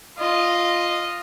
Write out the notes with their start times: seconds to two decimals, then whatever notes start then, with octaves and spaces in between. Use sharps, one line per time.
0.18 F4 D#5